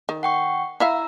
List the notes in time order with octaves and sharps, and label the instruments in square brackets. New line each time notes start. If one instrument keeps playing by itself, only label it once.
[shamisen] D#3
[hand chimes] F#5 G5 C#6
[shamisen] E4 E5 F5 [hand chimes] A#5 E6